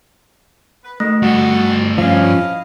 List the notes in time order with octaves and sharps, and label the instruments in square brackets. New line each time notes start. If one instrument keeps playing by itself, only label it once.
[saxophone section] B4
[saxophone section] B2 D#3 [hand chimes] A3
[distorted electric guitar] G2 A4 [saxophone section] F#4
[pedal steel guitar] F3 C#4 [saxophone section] E4 D#5 F5